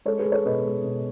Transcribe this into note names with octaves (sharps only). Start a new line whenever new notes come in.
G#3 A4 C#5
G#4 B4
G#3
A4 C#5
B2 B4 D#5
G#3
B2